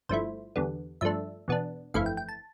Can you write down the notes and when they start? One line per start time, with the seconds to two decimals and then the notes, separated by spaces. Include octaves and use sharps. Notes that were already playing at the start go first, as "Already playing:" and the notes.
0.09 G1 G2 F3 A3 E4 C5
0.56 E2 D3 G3 B3
1.01 G2 F3 A3 D4 E5
1.48 E2 B2 B3 D4
1.94 G1 F2 E3 A3 E4 F5
2.06 G5
2.17 G5
2.29 A5